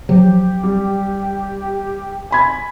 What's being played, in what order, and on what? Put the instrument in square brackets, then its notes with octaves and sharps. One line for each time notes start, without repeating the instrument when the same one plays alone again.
[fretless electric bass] F3 F#3 [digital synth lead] G4
[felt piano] G3
G#5 B5 G#6